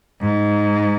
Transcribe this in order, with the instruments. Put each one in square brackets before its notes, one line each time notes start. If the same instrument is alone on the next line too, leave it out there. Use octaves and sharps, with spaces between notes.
[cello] G#2